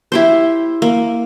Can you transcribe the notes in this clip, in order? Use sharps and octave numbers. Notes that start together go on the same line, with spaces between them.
E4 G4 C5
A#3